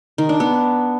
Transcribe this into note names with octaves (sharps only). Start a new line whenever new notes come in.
D#3
D4
B3